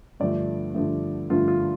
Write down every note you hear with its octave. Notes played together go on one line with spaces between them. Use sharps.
G2 D3 F3 A3 D5
G2 D3 F3 A3
G2 D3 F3 A3 F4
F4